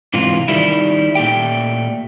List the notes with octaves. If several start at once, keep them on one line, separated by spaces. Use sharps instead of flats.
G#2 C3 E3 F4
D#3 G3 E4
A#2 A3 G4 G5